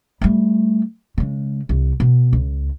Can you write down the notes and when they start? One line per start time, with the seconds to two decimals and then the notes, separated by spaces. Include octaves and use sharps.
0.21 G3 A3
1.18 C#3 G#3
1.69 C2
2.00 B2
2.33 C#2